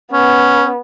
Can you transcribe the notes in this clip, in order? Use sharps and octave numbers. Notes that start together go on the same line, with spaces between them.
B3 C#4